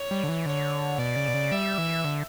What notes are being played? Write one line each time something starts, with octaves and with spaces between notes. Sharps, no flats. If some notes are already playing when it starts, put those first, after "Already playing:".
Already playing: C#5
G3
D3
E3
D3 C#5
B2 D5
C#3
B2
C#3
G3 E5
E3
D3